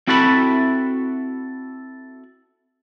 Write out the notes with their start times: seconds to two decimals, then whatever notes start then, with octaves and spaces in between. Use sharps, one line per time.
0.07 C4 E4 F#4 A4 E5 B5